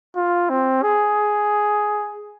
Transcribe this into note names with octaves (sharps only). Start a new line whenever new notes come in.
F4
C4
G#4